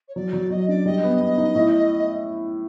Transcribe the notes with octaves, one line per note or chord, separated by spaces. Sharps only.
C#5
F#3 D5
F#3 D5
F#3 D#5
D4 D5
G3 D#5
B3
B3
D#4
A2